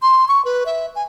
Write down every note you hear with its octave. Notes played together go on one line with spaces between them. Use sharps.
C6
C#6
B4
E5
G#5